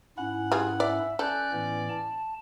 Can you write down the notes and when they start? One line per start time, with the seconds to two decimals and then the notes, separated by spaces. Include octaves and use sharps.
0.18 G#2 C#4 E4 F#5
0.52 G3 F4 G#4
0.80 D5 E5
1.19 C#4 A4 D5 F#6 G6
1.53 A2 E3 B3
1.89 A5